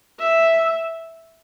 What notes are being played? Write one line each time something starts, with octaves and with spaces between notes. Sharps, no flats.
E5